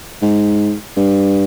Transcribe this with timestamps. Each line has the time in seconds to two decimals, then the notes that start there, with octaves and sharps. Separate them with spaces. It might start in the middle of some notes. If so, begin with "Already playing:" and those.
0.22 G#2
0.97 G2